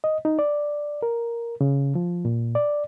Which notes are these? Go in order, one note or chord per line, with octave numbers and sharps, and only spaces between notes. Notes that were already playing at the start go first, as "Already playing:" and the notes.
D#5
D#4
D5
A#4
C#3
F3
A#2
D5